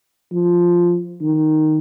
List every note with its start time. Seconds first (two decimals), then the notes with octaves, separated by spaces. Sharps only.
0.32 F3
1.22 D#3